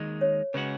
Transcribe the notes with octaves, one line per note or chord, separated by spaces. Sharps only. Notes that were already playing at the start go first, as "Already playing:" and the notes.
Already playing: D#2 D#3 G#3 D#4
C#5
C#3 G#3 C#4 F#4 B4